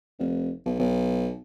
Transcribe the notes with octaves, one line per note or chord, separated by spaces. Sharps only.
F1
B1
B1